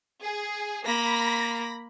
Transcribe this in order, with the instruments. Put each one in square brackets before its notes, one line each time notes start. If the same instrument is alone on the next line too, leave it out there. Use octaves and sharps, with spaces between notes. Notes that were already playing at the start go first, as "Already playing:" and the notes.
[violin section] G#4
[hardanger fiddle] A#3 [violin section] B5 A#6